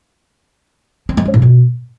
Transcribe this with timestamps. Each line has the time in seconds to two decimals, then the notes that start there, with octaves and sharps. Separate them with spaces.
1.09 C4
1.17 G#3
1.25 C#4
1.34 A2
1.42 B2